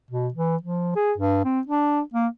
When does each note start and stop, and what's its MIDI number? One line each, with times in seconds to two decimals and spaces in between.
0.11 0.28 47
0.34 0.57 52
0.63 0.91 53
0.96 1.13 68
1.18 1.41 43
1.45 1.61 60
1.67 2.01 62
2.14 2.27 58